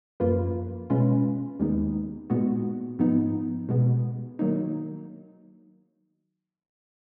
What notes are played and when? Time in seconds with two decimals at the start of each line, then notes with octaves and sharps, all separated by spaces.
0.20 F#2 F3 A#3 F4 B4
0.90 B2 G#3 C#4 F4 B4
1.60 D#2 D#3 G#3 B3 D#4
2.30 A#2 G#3 B3 D#4 F#4
2.99 G#2 F3 B3 D#4
3.69 B2 G#3 B3
4.39 D#3 F#3 A#3 D#4